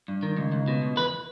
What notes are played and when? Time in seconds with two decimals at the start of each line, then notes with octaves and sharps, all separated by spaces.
0.08 G2
0.23 D#3
0.37 C#2
0.52 C#2
0.68 B2
0.82 C#2
0.97 E2 B4